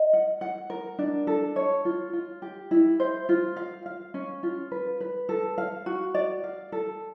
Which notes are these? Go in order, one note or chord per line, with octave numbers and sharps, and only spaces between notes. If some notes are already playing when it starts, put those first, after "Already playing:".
Already playing: D#5
F#5
F#5
A#4
D4
A4
C#5
F4
F4
G4
E4
C5
F4
F5
F5
C#4
F4
B4
B4
A4
F5
F#4
D5
F5
A4